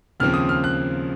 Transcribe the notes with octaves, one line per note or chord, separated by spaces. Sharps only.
D#2 C#3 F3 C4 F6
D#6
F6
F#6